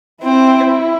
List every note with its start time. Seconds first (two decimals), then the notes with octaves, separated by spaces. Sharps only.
0.21 C4 E4